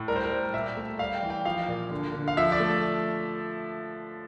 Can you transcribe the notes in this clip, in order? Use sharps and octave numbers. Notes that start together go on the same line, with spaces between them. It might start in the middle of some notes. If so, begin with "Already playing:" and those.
Already playing: A2
G3 A#4
C5
A#4
G3
A#2 E5
A3
G3 F5
G5
E3
G5
F3 F5
A#2
D3
D3
F5
F3 E5
D5
A3